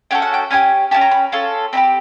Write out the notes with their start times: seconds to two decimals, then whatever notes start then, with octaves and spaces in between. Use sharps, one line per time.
0.11 C#4 F#4 A4 G5
0.22 F#5
0.34 G5
0.51 C#4 E4 G4 G#5
0.91 C#4 E4 G4 A5
1.01 A#5
1.11 B5
1.32 C#4 F4 A4
1.73 C4 D#4 G4 B5